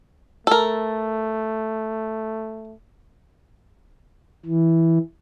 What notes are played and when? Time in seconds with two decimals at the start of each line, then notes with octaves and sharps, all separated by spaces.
0.47 A3 A4 A#4
4.46 E3